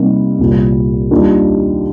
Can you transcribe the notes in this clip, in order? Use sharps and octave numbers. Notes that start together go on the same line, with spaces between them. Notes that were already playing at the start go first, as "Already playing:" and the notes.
Already playing: C3 G3 A#3 D#4
C2 A#2 G3
D#2 D#3 G3 D4 F4